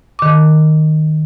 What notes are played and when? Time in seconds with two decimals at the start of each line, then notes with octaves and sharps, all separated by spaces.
0.19 D#3 D6